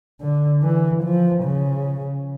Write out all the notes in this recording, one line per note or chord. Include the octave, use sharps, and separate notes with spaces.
D3
E3
F3
C#3